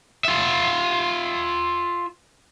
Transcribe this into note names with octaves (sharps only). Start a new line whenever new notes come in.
F4 E5